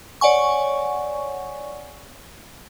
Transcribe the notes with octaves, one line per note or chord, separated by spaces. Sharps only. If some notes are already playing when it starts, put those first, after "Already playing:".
C#5 D5 F#5 G#5 C#6